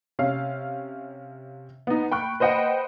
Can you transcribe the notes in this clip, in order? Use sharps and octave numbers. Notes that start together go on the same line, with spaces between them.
C3 C#4 F5
B3 D#4
G5 B5 C#6 F#6
B4 C5 D#5 F#5 G5 B5